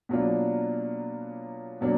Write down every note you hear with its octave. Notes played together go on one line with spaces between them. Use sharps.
B2 F#3 A#3 D4 F4
B2 F#3 A#3 D4